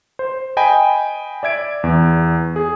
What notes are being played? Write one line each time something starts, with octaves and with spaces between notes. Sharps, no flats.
C5
D#5 G5 G#5 B5
D5 E5 G#6 D7
E2
G#4